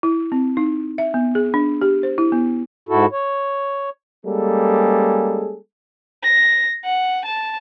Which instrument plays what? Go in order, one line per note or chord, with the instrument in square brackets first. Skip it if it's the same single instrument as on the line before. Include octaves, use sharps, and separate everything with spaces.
[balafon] E4
C4
D#4
E5
B3
G#4
D4
G4
C5
E4
B3
[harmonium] G#2 E4 F#4 A4
C#5
[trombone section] G3 G#3 A#3 C#4 G#4 A4
[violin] A#6
F#5
A5